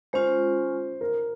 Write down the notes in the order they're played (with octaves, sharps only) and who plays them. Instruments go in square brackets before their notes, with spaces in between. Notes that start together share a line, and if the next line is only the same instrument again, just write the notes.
[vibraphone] G#3 C#4 F4 [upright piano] C5
[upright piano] A#4